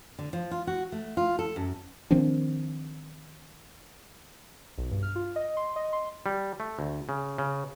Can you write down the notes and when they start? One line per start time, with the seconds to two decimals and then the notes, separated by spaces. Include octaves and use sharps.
0.19 D3
0.33 F3
0.51 F4
0.67 F#4
0.92 A3
1.17 F4
1.39 A4
1.56 F#2
2.11 D#3 F3 C4 D4
4.78 B1
4.91 G2
5.03 F6
5.16 F4
5.36 D#5
5.57 C6
5.76 D#5
5.93 C6
6.26 G3
6.60 A3
6.79 D2
7.09 C#3
7.38 C#3